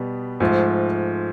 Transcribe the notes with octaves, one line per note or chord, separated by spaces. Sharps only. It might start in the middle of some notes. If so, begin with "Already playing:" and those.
Already playing: B2 G3 B3
G#2 F3 A3